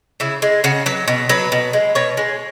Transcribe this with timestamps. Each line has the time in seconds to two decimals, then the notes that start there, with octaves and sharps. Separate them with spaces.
0.20 C#3 E4
0.42 G#3
0.64 C#3 F#4
0.86 F#3 B4
1.08 B2
1.29 F#3 B4
1.52 B2
1.73 G#3
1.95 B2 C#5
2.17 G#3